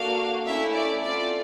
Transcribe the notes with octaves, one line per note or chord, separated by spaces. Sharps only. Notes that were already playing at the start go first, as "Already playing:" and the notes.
Already playing: A#3 D4 F#4 A4 F5
A3 C#4 E4 E5
D5
C4 F4 A4 D5